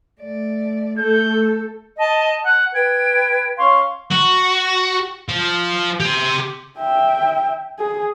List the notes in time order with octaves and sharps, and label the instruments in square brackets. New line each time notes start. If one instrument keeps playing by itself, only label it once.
[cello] A3 D5
[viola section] A3 [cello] A4 [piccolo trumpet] G6
[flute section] D#5 A5
F#5 F#6
B4 G5 G#6
C#4 F5 C6 C#6
[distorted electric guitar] F#4
F3
G4 C6
[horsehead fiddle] E5 G5
G#4